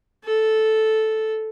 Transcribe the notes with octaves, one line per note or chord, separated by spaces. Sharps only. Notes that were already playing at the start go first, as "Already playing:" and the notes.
A4